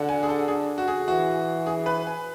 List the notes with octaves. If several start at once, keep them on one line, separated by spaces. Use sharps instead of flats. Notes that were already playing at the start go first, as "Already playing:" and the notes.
Already playing: D3 F#5
G#5
G#4
A4
G#4
F#4
G#4
E3 F#4
G#4
B4
G#5